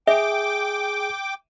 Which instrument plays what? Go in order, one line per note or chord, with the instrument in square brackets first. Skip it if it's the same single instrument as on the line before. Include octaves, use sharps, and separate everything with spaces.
[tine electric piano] G#4 [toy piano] E5 [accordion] G5 D6